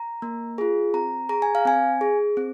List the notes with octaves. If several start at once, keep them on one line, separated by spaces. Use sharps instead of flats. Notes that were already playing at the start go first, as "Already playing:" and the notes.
Already playing: A#5
A#3
F4 G#4
C4 A#5
G#4 A#5
G#5
F5
C4 G#5
G#4
C4